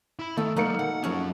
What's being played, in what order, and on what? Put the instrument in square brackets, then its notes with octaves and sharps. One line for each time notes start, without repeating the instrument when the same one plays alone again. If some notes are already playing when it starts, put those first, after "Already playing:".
[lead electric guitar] E4 B5
[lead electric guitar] D#3 [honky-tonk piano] A3 [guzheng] A4
[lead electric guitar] F#3 G#3 [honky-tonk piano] A#3 A#4 C#7 [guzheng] D#4 F#4 D5
[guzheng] B2 [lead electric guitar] F#5
[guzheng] F2 G#4 C#5 [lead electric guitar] F#3 C#4